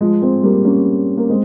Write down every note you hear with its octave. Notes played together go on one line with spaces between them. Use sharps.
F3 G#3
G#3 C4
G3 A#3
A#3 C#4
A#3
G#3 C4